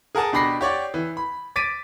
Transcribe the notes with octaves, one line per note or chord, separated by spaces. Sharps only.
G#4 A#4 F#5 A5 D#6
B2 D4 G4 B5 A#6 C7
G4 C#5 D5 F#5
E3
B5
D6 A6 B6 D7 D#7